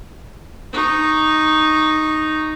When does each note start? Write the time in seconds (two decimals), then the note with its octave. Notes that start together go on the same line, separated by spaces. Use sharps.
0.73 D#4 C#6